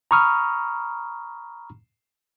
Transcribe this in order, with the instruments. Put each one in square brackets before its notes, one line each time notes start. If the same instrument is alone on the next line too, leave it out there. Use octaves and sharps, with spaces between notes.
[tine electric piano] A#5 B5 C#6 D#6 F6